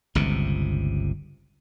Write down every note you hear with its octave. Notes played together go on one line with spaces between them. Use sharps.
G1 C#2 C3